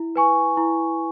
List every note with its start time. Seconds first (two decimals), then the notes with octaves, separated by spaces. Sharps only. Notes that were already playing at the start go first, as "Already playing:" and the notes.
Already playing: E4
0.16 B4 G#5 C#6
0.57 E4